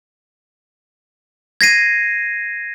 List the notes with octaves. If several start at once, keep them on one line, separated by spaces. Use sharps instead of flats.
G#6 A#6 C7 D#7